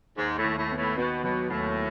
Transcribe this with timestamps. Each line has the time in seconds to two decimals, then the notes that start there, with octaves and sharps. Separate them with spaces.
0.18 D#2 G#2
0.38 A2
0.44 D#2
0.58 A2
0.71 B3
0.78 A2
0.97 B2 B3
1.24 B2 F#3
1.50 D#2 A2